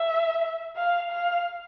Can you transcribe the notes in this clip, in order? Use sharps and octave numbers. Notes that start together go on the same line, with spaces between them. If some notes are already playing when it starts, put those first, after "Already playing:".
Already playing: E5
F5
F5